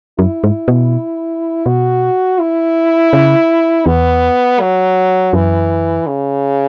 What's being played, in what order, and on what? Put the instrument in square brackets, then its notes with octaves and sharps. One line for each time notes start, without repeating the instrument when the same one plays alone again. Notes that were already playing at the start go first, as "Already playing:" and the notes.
[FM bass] F#2 [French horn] E4
[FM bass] G#2
B2
[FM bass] B2 [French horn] F#4
[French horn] E4
[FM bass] C#3
[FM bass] E2 [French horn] B3
[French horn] F#3
[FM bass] F#2 [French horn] E3
[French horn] C#3